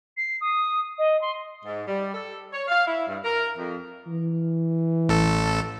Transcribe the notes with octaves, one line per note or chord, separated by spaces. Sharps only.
C7
D#6
D#5
C6
G#2
G3
A4
C#5
F5
E4
G2
A#4
F2
E3
A1 A4